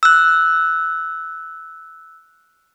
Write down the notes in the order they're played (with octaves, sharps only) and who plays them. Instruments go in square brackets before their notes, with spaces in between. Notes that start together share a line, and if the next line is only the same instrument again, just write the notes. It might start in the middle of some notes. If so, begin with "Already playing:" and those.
[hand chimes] E6 F#6